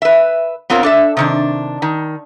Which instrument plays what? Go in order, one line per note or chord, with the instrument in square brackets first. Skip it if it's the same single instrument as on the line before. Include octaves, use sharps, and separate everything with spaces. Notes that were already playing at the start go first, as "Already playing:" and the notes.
[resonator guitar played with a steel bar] B4 E5
B3 C4 F4 A#4 C#5
D4 A4 E5
C3 D#3 D4
D#3